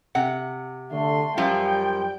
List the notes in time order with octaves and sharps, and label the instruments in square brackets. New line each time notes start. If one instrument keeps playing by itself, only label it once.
[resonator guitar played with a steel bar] C3 F#5
[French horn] D3 [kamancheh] A3 C6
[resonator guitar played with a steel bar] F#2 F3 F4 [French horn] G3 [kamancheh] G5